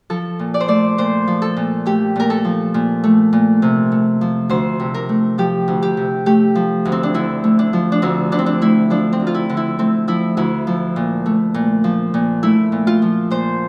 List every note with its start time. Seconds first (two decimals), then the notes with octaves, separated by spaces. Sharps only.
0.10 F3 A4
0.39 A#2
0.54 D5
0.60 C5
0.68 A3 D5
0.98 A#2 C5
1.27 F3
1.42 A4
1.56 A#2
1.86 A3 G4
2.16 A#2 A#4
2.30 A4
2.45 F3
2.74 A#2
3.04 A3
3.33 A#2
3.62 C3
3.92 A3
4.21 F3
4.49 D2 C5
4.80 C3
4.94 A#4
5.09 A3
5.38 F3 G4
5.68 D2
5.82 G4
5.97 C3
6.26 A3 G4
6.55 F3
6.85 D2
6.92 C4
7.03 D4
7.14 D3 E4
7.44 A3
7.59 D4
7.73 F3
7.92 D4
8.02 D2 C4
8.32 D3 D4
8.39 C4
8.46 D4
8.61 A3 E4
8.90 F3 D4
9.13 C4
9.20 D2
9.27 F4
9.34 E4
9.49 D3
9.57 E4
9.79 A3 C4
10.08 F3 E4
10.37 D2 E4
10.67 F3
10.96 A#2
11.26 A3
11.54 A#2
11.84 F3
12.14 A#2
12.43 A3 E4
12.72 A#2
12.87 F4
13.02 F3
13.30 A#2 C5